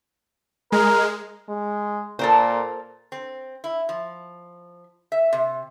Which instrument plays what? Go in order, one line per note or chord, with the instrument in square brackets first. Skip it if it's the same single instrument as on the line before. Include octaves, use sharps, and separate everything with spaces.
[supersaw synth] G#3 [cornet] A#4
[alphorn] G#3
[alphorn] A#2 [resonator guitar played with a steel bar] A4 A#4 C5
[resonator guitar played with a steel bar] C4
E4
F3
E5
C3